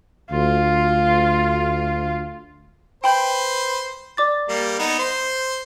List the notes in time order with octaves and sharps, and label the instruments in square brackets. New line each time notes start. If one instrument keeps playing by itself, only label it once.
[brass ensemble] D2 [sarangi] F4
[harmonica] B4 C5 [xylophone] G5 B5 G6
[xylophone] D5 D6 A6
[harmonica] G3 A#3
B3 D#4
C5